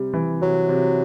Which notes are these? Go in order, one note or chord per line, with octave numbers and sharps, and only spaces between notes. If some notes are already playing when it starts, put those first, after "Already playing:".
Already playing: C3 G3
E3
C3 F#3
C3